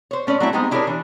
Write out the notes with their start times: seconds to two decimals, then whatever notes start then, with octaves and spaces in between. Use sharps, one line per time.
0.11 C5 C#5
0.27 A3 C#4 B4 D5
0.40 F#3 A3 C4 E4
0.53 G#3 B3 C4 D#4 G4 G#4
0.71 D4 E4 G4 G#4 A#4 C#5
0.87 E3 D4